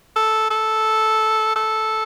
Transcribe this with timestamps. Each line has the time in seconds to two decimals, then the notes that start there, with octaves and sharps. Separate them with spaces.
0.16 A4
0.50 A4
1.56 A4